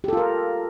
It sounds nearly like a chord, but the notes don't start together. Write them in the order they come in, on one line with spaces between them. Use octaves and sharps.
G4 A4 F4 A#4